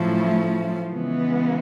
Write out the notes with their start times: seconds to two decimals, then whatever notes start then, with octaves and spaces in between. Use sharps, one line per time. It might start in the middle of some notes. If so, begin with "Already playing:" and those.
Already playing: A2 F3 F#3 A3 C#4 E4
0.90 C#3 E3 G#3 B3